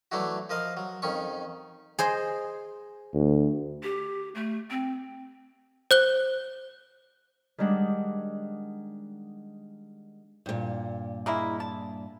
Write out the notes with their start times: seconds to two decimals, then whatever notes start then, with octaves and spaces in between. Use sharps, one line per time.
0.12 E3 F#3 A3 D4 E4 F#4
0.50 F3 A#4 D#5 F5
0.77 F#3
1.02 F2 D#3 C#4 C#6
1.99 G#4 C5 D#5
3.14 D2
3.83 G4
4.35 A3
4.70 C4
5.91 C5 F#6 G7
7.58 D#3 G3 G#3 D4 F#5
10.46 G2 A#2
11.26 G#3 A#3 E4
11.60 A5